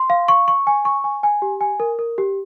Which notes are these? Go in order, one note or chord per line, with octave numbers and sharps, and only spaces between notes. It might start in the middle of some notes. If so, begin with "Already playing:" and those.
Already playing: C6
F5
C#6
C#6
G#5
C#6
G#5
G#5
G4
G#5
A#4
A#4
G4